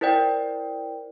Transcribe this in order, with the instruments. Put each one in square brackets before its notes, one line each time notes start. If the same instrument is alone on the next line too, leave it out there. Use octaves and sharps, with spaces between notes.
[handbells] E4 A#4 C5 D5 G5